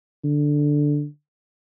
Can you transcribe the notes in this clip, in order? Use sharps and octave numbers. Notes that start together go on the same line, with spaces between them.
D3